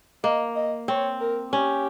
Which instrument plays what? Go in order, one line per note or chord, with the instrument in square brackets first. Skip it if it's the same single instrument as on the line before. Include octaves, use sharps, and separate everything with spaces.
[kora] A#3 [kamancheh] D#5
[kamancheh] D#5
[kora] C4 [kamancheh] C#5
[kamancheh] A#4
[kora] C#4 [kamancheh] G4